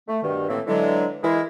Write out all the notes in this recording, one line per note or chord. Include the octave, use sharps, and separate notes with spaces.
A3
G2 B2 D#3
A2 E3 A#3 C4
D3 E3 F#3 G#3
E3 G#3 E4 A#4